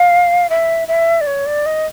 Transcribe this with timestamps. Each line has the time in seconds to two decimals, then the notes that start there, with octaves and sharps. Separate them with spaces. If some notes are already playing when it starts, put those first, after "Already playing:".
Already playing: F5
0.49 E5
0.88 E5
1.21 D5
1.27 C#5
1.46 D5
1.66 D#5